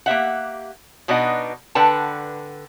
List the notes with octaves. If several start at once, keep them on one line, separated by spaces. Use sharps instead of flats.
A#3 G4 E5 F#5
B2 B3 D4 D#4 D#5 F#5
D3 B4 F#5 G5 A5